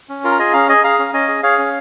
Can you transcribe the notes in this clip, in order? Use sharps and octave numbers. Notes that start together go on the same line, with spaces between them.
C#4
F4 A#4
A#5
G#4 D#5 G#5
C#4 F5 A#5
G#4 D#5 G#5
G#4 F5 A#5
C#4
C#4 D#5 G#5
G#4
G#4 C#5 F5
C#4